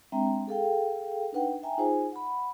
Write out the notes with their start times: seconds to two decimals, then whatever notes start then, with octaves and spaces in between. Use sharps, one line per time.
0.12 G#3 C4 D4 E5 G5 A#5
0.47 G#4 A4 F5 G5
1.33 D4 D#4 B4 F#5 G5
1.63 E5 G5 G#5 A#5
1.77 D#4 F4 G#4 C5 G#5
2.12 F#5 B5